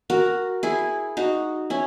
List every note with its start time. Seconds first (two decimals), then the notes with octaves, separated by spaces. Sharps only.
0.10 F#4 A#4
0.63 E4 G#4
1.17 D#4 F#4
1.70 C#4 E4